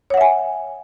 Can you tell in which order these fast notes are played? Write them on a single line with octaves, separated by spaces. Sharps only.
C#5 F#5 E5 G#5